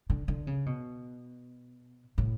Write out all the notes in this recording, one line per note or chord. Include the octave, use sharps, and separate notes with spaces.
D3
D3
C#3
B2
A2